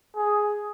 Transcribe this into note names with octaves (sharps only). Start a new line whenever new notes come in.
G#4